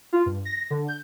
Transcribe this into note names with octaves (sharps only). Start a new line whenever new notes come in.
F4
G2
A#6
D3
G6